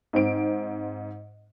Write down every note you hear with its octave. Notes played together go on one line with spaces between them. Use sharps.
G#2 C4 D7